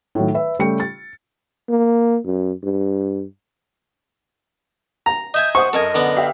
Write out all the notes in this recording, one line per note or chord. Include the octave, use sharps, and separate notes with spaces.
A2 D#3 F#3
B4 E5
C#3 G3 A3 G4 G5 C#7
A6
A#3
F#2
G2
A#5
D#5 E5 G#5 G6
C5 F#5 C#6 D#6
F#2 A4 A#4 D#5 G#5
D3 B3
G4 E5 F5